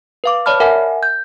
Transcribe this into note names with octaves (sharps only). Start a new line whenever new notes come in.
B4 F5 D6
C#5 D5 A5 B5 F6
A#4 E5 F#5 G#5
G6